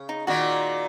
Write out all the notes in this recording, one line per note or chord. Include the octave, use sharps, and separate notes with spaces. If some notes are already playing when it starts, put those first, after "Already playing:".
Already playing: C#3
D#4
A#2 D#3 F#4